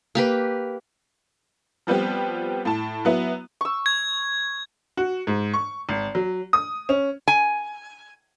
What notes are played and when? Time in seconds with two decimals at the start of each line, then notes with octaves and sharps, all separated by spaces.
0.15 A#3 G4 B4
1.87 F3 G3 B3 C4 G4
2.65 A2 A5
3.05 F#3 B3 E4
3.61 C#6 E6
3.86 G#6
4.97 F#4
5.27 G#2
5.54 C#6
5.89 G#1
6.15 F#3
6.53 D#6
6.89 C#4
7.28 G#5